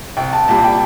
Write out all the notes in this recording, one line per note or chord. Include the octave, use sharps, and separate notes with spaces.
C2 G5
A5
A#2 G3 A5
G5